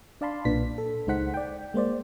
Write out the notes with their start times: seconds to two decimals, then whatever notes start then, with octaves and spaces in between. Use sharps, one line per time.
0.21 D4 D5 F5 A5 B5 C6
0.45 B1 A#2 D4 B4 B6
0.78 A4
1.07 C#2 G#3 D#4 C5 F#5 B6
1.34 D5 G5
1.74 G#3 A#3 C5 D5